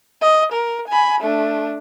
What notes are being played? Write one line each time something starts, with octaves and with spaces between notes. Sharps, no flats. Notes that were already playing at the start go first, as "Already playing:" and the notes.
D#5
A#4
G#5 B5
A3 D4